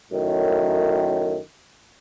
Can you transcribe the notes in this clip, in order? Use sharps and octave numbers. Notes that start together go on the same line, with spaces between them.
F#2 A2 D#3